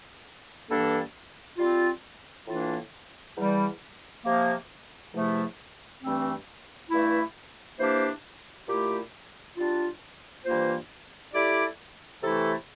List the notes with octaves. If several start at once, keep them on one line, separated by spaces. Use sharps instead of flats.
G2 E3 A#3 D4 A4
G3 C4 F4
A2 E3 A#3 D4 F4
E2 E3 G3
C3 F3 A#3
E2 C3 F3 A3 E4
G2 E3 A3 C4
G2 E3 A3 E4
E3 A#3 D4 G4 C5
A#2 A3 E4 G4
G3 D4 F4
G2 E3 A#3 F4 C5
A3 E4 G4 D5
C3 E3 A3 E4 A4